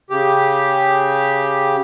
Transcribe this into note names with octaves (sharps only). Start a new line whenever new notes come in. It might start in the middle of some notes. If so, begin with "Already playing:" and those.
C#3 G4